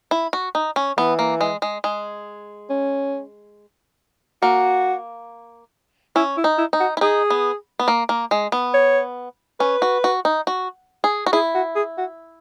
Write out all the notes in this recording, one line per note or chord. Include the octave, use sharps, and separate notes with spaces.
E4
F#4
D#4
C#4
E3 B3
A#3
G#3
G#3
G#3
C#4
A#3 F#4
C#4 E4
E4
D#4
E4
D#4
F#4
E4
D#4 G#4
B3
B3
A#3
A#3
G#3
B3
C#5
C#4 B4
F#4
F#4
D#4
F#4
G#4
F#4
E4 G#4
F#4
G#4
F#4